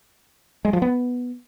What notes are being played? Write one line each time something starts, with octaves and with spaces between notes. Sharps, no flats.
G#3
F3
B3